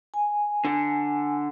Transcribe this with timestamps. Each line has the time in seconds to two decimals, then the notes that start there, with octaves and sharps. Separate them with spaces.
0.14 G#5
0.65 D3